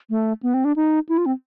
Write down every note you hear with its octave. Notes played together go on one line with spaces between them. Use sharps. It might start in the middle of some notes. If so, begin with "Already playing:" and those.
A3
B3
C4
D4
D#4
E4
F4
C4